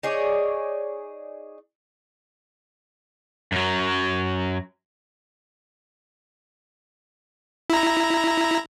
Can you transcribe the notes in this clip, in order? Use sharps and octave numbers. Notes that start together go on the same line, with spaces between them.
D#4 G#4 C#5 D5
F#2 F#3
E4 A#5